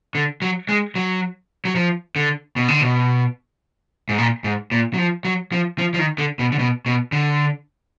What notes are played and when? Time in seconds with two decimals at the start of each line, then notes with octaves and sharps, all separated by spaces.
0.15 D3
0.42 F#3
0.69 G#3
0.95 F#3
1.65 F#3
1.76 F3
2.16 D3
2.56 B2
2.68 D3
2.81 B2
4.09 G#2
4.18 A#2
4.44 G#2
4.71 A#2
4.94 F#3
4.98 F3
5.25 F#3
5.52 F3
5.78 F3
5.94 F3
5.99 D#3
6.18 D3
6.39 B2
6.52 D3
6.59 B2
6.86 B2
7.12 D3